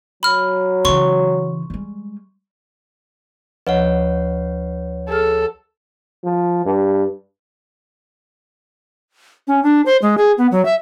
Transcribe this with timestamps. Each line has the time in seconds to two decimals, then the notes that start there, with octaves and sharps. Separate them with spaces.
0.23 F#3 B5 F6
0.85 C#3 E3 C6 C#6
1.70 G3 G#3
3.67 D2 F3 B4 C#5 D#5 F#5
5.09 G#4 A4 F6
6.24 F3
6.65 G2
9.48 C#4
9.63 D4
9.86 C5
10.02 G#3
10.18 G#4
10.38 B3
10.52 F#3
10.65 E5